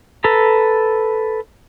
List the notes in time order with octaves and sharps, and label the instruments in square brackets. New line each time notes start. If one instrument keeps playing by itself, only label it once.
[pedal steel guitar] A4 B4 A#5